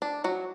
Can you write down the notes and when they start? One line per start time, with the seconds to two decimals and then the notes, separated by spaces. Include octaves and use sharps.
0.02 D4
0.24 F#3 F#4